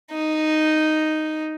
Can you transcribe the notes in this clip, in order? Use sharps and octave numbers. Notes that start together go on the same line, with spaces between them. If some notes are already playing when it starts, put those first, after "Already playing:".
D#4